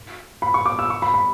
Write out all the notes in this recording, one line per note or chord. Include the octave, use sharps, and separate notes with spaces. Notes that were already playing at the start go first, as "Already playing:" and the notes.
B5
C#6
D6
E6
C#6
B5
B5